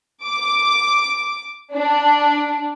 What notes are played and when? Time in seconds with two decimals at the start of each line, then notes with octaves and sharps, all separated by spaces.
0.23 D6
1.74 D4